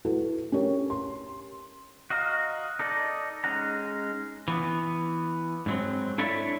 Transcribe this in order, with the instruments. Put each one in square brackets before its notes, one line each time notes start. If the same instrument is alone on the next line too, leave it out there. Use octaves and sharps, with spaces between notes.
[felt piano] E4 F#4 A4 B4
C#4 G4 A#4 C#5
C6
[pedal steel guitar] F#4 D#5 F5 A#5
D#4 A4 D5 D#5
G#3 C#4 D#4 F#5 A#5
[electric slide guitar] E3 B3
G#2 F#3 C4
D4 E4 A4 C#5 D5 E5